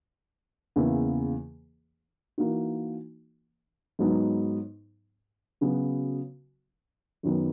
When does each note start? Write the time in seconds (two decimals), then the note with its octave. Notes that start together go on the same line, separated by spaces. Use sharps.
0.76 E2 C#3 E3 A#3 E4
2.38 E3 A#3 D#4 F#4
3.99 G#2 F#3 B3 D#4
5.61 C#3 F#3 B3 F#4
7.23 F#2 D#3 F#3 B3